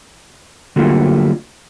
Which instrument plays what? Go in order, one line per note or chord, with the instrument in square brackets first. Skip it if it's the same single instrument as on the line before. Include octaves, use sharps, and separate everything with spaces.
[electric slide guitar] D3 F#3 G3 A3 A#3 F4